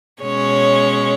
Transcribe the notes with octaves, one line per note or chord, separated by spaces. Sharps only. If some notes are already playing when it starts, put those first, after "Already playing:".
B2 G#3 C#4 C#5